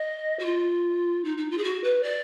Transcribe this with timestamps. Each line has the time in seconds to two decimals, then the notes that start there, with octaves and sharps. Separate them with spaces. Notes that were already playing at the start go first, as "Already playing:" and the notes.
Already playing: D#5
0.39 F#4
0.45 F4
1.24 D#4
1.37 D#4
1.50 F4
1.57 G#4
1.63 F#4
1.83 B4
2.03 D5